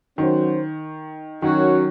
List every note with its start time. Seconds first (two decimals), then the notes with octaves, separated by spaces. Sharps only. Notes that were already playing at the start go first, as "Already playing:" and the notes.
0.18 D#3 F#3 C#4 F#4 C5
1.42 D#3 F#3 C#4 F#4 A#4 C#5